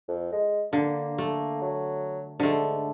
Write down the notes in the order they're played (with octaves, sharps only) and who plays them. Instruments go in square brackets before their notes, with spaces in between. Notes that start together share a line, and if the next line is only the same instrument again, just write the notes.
[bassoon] F2
G#3
[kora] D3 [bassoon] A#3
[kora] A3
[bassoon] F#3
[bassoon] G#2 [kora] D3 A3